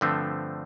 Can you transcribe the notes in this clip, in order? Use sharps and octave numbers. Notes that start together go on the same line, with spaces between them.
G2 D3 F3 A3 C4